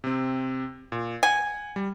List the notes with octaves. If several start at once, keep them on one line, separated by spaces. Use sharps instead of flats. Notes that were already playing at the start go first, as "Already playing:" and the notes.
C3 C4
A#2
F#5 G#5
G3